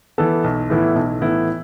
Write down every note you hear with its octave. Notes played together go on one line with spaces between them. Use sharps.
E3 B3 A4
B1
A2 E3 B3 E4
B1
A2 E3 B3 E4